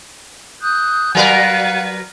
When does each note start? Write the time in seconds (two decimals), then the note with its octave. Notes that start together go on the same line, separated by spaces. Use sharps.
0.62 D#6 F#6 G6
1.15 F#3 A#4 B4 F5 F#5 F#6